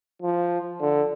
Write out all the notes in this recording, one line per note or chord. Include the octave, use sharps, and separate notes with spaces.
F3
D3